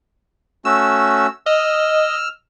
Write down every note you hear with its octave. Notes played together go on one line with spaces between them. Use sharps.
A3 C#4 F#4 E6
D#5 E6 F6